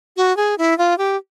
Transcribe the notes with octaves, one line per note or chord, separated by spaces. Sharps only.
F#4
G#4
E4
F4
G4